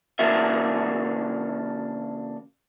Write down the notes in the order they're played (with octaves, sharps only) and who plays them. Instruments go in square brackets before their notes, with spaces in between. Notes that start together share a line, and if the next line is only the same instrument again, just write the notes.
[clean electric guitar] C#3 E3 A#3 D4 F#4 E5